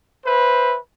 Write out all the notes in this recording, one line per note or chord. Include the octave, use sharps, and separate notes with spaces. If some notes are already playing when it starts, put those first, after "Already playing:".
B4 C5 E5